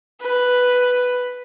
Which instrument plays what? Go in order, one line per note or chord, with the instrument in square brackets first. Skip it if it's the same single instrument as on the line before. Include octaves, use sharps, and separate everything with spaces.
[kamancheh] B4